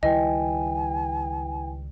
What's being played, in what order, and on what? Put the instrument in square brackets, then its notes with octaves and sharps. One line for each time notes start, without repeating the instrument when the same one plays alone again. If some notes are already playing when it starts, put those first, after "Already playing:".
[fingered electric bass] C#2 D#3 G3 [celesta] E4 B4 G5 [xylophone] D#5 [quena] G#5